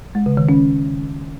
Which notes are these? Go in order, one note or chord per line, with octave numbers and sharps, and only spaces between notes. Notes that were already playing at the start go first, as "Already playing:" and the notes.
G#3
C#3
D#3
C#4